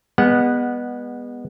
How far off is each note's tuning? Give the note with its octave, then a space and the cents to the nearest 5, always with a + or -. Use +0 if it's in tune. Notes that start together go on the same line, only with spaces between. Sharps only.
G#3 -35 B3 -10 F#5 +0